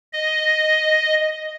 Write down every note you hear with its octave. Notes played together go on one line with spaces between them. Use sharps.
D#5